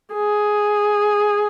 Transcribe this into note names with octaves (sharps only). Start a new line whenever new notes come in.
G#4